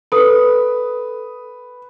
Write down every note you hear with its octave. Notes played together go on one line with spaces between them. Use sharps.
A4 B4 D#6